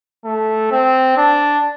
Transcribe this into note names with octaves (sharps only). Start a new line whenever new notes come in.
A3
C4
D4